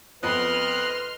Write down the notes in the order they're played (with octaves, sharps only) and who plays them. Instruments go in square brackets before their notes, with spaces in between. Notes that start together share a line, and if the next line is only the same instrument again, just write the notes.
[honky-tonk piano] F2 B3 [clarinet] B4 [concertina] D#5 D#6 F#6 [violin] C6 F6